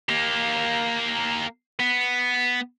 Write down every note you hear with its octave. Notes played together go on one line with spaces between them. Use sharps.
A#3 G4
B3